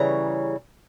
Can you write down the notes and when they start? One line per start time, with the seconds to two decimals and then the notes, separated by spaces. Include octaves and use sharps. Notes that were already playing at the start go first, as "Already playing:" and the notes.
Already playing: C#3 E3 G3 A#5